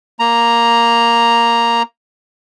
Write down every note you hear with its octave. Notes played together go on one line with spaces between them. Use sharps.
A#3 A#5